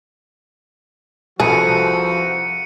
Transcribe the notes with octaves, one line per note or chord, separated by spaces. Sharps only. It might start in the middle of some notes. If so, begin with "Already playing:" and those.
C2 F3 F#4 G#4 A4 B4 C#7 D#7